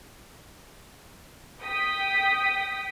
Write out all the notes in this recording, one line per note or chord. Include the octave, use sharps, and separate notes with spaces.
G5 D#6 B6